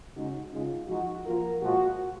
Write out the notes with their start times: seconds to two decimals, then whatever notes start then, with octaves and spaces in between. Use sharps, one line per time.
0.14 C#3 G#3 D#4 F#4
0.50 C#3 G#3 D#4 F4
0.87 F3 G#3 D#4 F#4
1.24 F3 A#3 F4 A#4
1.61 A#2 F3 G#3 F#4